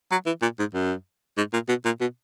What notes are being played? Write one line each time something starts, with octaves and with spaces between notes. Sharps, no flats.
F#3
E3
A#2
G#2
F#2
G#2
A#2
B2
A#2
B2